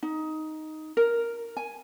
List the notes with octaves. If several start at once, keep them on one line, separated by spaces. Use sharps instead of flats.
D#4
A#4
G#5